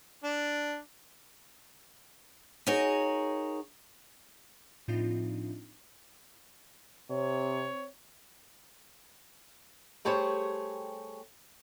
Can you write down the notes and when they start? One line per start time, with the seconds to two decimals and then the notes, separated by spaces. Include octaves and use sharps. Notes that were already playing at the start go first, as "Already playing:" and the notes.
0.24 D4
2.67 D#4 F#4 G#4 A#4 C#5
4.88 A2 F3 C4 D4 D#4 F4
7.10 C3 C4 C#5
10.05 G3 A3 G4 G#4 C5 C#5